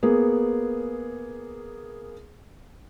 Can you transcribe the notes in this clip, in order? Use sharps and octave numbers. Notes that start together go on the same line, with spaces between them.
A#3 B3 G#4